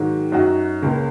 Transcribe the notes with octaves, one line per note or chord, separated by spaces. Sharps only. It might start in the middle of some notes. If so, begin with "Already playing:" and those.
Already playing: G#2 D#3 F#3
F#2 F#3 D#4 F#4
C#2 C#3 A#3